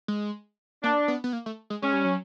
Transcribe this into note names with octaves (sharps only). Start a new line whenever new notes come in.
G#3
A#3 D4
B3
B3
A#3
A3
G#3
G#3 C#4
G3
F#3